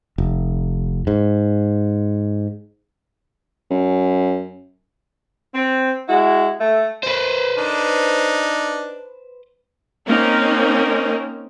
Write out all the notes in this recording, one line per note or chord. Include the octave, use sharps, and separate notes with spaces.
F1
G#2
F#2
C4
G#3 E4 F#4
A3
B4 C5
D4 D#4
A#3 C4 C#4 D#4 A#4